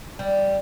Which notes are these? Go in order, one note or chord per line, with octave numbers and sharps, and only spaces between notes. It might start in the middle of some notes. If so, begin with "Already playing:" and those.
G3